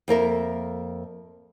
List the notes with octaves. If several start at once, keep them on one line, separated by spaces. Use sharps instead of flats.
F2 A#3 A#4 E5